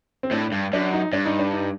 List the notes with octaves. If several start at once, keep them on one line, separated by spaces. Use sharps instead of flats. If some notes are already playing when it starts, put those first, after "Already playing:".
C4
A2 D4
G2
F#2 D4
D#4
G2 D4
D#4
D4
D#4